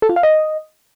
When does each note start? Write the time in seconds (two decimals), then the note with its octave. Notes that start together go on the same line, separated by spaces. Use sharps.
0.02 A4
0.09 F4
0.16 F5
0.23 D#5